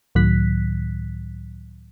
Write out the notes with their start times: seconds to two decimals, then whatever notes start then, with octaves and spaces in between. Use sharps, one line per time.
0.15 C#2 A2 D#3 F#3 F#6 B6